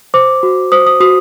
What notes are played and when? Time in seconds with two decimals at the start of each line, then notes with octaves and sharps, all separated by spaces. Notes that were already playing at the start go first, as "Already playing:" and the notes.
0.14 C5 D6
0.43 F#4
0.72 C5 D#6
0.87 D#6
1.00 F#4 D#6